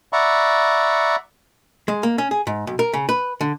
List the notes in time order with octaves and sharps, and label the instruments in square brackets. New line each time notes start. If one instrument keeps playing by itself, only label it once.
[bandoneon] D5 E5 F#5 A#5 B5 C#6
[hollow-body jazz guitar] G#3
A#3
C#4
G#4
G#2
B1
A#4
C#3
B4
D3